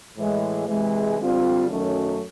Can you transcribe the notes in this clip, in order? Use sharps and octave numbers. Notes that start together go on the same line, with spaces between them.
A2 E3 G#3
C3 E3 G#3
D3 G3 C4 F4
F#2 D#3 F#3 A3 C#4